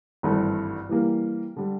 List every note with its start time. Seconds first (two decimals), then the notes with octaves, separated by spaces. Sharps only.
0.23 G#1 G2 E3 A3
0.89 E3 G3 A#3
1.56 D3 G3